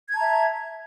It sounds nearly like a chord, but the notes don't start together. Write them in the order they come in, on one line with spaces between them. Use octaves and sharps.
G#6 A5 A#5 E5